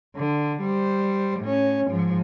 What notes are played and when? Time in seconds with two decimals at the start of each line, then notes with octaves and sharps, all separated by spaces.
0.16 D3
0.61 G3 C5
1.40 A2 C#4
1.87 G#2 F3